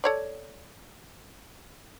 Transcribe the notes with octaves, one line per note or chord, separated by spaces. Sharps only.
A4 C#5 D5